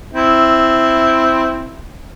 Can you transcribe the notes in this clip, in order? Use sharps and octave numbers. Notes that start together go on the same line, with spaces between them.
C4 E4